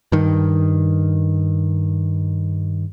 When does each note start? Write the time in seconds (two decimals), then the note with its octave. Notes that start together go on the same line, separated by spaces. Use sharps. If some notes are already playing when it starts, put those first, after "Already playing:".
0.12 G2 D#3